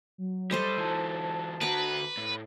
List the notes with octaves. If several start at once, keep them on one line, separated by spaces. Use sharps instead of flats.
F#3
G3 A4 C5 D#5
E3 F#3 A5
D2 F#4 B4 A#5 D6
A2